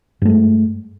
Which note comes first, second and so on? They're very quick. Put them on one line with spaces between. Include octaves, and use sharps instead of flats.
G2 A3 G#3